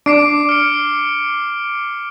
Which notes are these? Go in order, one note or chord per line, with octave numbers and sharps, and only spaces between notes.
D4 D6 C7 D7
F6 C#7